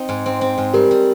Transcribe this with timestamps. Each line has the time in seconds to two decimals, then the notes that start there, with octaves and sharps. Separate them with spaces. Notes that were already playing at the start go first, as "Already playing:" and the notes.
Already playing: C4 D#4
0.09 G#2
0.26 C4
0.41 C4
0.58 G#2
0.74 G3 G4 A#4
0.91 G3